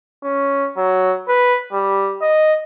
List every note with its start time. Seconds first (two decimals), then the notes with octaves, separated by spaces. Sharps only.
0.24 C#4
0.77 F#3
1.29 B4
1.73 G3
2.22 D#5